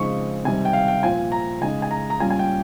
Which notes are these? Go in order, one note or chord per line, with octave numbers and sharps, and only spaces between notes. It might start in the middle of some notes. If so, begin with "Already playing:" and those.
Already playing: C#3 F3 G#3 C4 D#4 C#6
C3 D#3 G3 G#5
G5
F5
G5
A#2 F3 C4 F4 G#5
A#5
C#3 G#3 D#4 G#5
G#5
A#5
A#5
A#2 G3 C#4 F4 G#5
G#5
G5